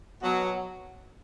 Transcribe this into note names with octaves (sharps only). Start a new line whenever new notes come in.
B2 F#3